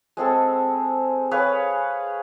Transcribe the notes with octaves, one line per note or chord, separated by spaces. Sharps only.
G#3 C4 G#4 A4
G#4 B4 C#5 F5